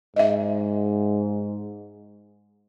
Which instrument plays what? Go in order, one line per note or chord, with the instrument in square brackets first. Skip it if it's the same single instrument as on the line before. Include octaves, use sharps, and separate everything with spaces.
[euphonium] G#2 [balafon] D#5 E5